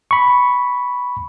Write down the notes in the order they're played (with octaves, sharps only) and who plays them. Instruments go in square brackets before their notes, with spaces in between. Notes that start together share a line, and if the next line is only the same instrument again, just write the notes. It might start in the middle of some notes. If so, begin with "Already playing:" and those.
[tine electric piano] B5 C#6